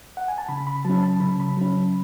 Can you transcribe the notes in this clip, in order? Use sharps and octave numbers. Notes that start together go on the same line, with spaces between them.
F#5
G#5
A5
C#3 B5
B5
F#3 C#4 A5
A5
C#3 B5
B5
F#3 C#4